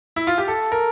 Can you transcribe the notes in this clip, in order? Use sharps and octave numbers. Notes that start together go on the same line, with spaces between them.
E4
F4
G4
A4
A#4